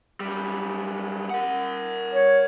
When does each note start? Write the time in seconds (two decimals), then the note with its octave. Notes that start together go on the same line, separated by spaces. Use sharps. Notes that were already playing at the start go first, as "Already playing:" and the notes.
0.20 F#2 G3
1.30 A#4 F#5
2.14 C#5